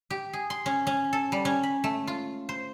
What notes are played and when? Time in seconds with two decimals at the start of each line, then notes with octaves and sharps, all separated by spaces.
0.10 G4
0.33 G#4
0.50 C6
0.66 C#4
0.87 C#4
1.13 A4
1.32 G3
1.45 C#4
1.63 B5
1.84 A3
2.07 F4
2.49 C5